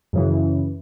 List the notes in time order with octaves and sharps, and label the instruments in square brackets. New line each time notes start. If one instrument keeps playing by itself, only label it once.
[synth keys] F#2 C#3 E3